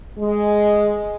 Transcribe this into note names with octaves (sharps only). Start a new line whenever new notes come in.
G#3